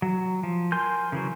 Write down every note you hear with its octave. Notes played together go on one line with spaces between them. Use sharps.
F#3
F3
A#4 G#5 C6 G6
C#3 E3 F#3